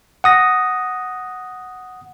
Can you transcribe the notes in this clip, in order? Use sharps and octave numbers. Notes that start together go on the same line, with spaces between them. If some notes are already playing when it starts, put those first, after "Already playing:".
F#5 D#6 A#6